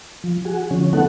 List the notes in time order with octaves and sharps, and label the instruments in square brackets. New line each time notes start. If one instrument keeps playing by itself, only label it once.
[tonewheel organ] F3
F#4 G#4
D3 F3 C#4
A3 B3 D#4 A4 F#5